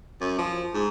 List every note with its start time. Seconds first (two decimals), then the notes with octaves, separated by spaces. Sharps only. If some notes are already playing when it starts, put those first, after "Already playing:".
0.21 F#2
0.38 F3
0.74 G#2